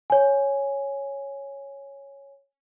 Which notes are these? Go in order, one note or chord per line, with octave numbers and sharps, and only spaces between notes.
C#5 G#5